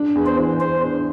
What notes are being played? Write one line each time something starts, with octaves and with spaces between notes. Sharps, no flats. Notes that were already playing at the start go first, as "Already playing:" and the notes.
Already playing: D4
E2
C5
E3
E2 C5
D4